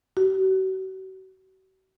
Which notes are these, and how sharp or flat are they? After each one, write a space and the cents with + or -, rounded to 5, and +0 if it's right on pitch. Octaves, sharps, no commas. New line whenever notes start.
F#4 +40